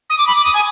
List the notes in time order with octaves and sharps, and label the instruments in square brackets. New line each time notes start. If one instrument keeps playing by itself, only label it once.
[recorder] D#6
D6
B5
D6
D#6
G#5